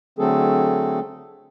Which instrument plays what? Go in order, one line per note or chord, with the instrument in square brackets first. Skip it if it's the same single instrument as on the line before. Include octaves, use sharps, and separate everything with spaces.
[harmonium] D3 F#3 A3 C4 G#4 A4